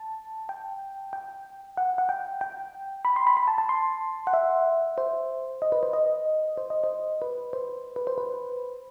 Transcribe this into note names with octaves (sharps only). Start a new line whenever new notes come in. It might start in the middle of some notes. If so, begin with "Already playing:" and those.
Already playing: A5
G5
G5
F#5
F#5
G5
G5
B5
C6
B5
B5
A5
A5
C6
F#5
E5
C5
D#5
B4
C5
D#5
C5
D#5
C5
B4
C5
B4
C5
B4